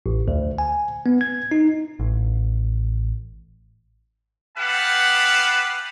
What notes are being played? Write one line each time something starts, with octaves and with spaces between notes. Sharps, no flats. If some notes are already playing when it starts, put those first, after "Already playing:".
A1
D2
G#5
B3
G#6
D#4
A1
B3 G4 B4 F5 F#5 A5